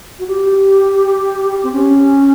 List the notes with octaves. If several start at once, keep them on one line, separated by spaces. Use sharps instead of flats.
F#4
G4
C4
C#4